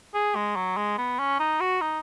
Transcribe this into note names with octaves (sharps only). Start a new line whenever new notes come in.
G#4
G#3
F#3
G#3
B3
C#4
D#4
F#4
D#4